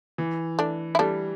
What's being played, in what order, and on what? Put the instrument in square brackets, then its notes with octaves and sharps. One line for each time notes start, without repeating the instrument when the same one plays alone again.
[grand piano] E3
[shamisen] A3 D4
E4
[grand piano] G3 [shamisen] A3 D4